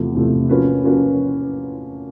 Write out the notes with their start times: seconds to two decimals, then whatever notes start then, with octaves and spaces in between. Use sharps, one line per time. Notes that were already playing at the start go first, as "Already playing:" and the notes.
Already playing: E2 C3 F3 A3
0.15 E2 C3 F3 A3
0.49 F3 A#3 C#4 F#4 B4
0.84 F3 A#3 C#4 F#4 B4